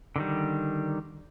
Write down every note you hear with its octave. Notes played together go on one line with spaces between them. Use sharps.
D3 D#3 G3